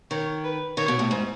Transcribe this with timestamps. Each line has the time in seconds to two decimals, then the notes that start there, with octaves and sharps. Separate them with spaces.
0.11 D#3 C#5
0.44 B4
0.77 D#3 C#5
0.88 B2
0.99 A2
1.11 G#2